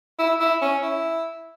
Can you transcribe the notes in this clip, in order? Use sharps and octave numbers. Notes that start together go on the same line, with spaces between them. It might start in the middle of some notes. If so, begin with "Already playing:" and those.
E4
E4
C#4
E4